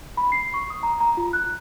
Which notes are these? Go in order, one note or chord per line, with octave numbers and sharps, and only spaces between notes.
B5
C7
C#6
D#6
A#5
A#5
F4
F#6